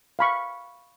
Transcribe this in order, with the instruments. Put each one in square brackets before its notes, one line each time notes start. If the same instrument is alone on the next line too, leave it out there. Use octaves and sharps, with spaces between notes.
[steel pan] F5 B5 C#6